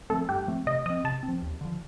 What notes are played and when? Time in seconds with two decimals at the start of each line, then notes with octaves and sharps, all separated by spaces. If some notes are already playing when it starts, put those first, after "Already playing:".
0.10 F3 A3 C4 A4
0.29 G2 G4
0.47 F3 A3 C4
0.67 C3 D#5
0.86 F3 C4 D#5
1.04 C3 A5
1.23 C4
1.28 F3
1.42 D#2
1.61 D3 F3